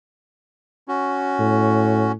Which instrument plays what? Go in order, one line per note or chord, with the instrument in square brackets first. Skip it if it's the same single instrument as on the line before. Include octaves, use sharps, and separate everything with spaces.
[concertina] C#4 F#4
[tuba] A2